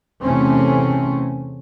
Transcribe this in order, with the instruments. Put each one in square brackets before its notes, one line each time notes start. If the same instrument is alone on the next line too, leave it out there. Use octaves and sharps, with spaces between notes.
[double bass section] E2 C3 A3 C4 C#4